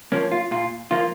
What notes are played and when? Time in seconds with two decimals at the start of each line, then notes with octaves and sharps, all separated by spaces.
0.12 F3 A#3 C#4
0.32 F4
0.51 A#2 F4
0.91 F3 A#3 F4